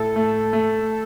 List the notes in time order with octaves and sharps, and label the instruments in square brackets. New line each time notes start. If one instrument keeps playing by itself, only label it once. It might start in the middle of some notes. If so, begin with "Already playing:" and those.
Already playing: [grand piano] A2 [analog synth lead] A4
[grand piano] A3
A3